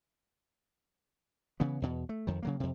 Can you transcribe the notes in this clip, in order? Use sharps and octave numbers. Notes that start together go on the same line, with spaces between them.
C#3 E3 B3
E2 B2
A3
F2 D#3
C#3 F#3 A#3
F2 C3